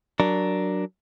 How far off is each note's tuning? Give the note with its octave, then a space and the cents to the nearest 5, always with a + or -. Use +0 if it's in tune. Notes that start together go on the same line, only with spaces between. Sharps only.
F#3 +15 D4 +0 A#4 +0